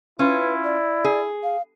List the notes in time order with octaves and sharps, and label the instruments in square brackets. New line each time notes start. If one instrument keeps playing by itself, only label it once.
[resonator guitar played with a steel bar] C#4 F4 [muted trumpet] E4 [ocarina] B4
[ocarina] D5
[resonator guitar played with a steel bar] G#4
[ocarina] F5